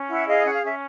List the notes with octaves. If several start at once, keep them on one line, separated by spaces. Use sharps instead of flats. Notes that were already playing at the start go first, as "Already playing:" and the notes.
Already playing: C#4
E4 E5 F#5
G#4 D#5 F5
C#4 F#5
F5
C#4 E5